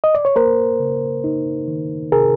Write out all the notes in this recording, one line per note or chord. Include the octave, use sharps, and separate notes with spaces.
D#5
D5
C#5
A#3 A#4 C5
C#3
D#4
D#3
C3 G#4 A#4